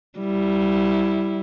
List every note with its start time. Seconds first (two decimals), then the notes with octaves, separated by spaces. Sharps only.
0.19 G3 E4